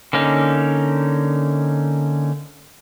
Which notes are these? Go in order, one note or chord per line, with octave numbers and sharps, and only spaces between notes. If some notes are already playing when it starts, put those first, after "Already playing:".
D3 A#3 C#4 D#4